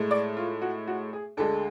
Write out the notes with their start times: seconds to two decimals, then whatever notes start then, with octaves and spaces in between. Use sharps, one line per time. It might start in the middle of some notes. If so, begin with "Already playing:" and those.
Already playing: A2 G#3
0.11 D5
0.37 F4
0.62 F#4
0.87 F#4
1.13 G#4
1.37 D2 D3 G#3 A4